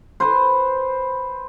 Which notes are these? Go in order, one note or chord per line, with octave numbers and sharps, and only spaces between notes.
B4 C5